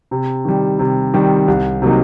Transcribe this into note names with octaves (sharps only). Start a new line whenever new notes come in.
C3
D#3 G3
C3
D#3 G3
C2
C3 F#3 A#3 D#4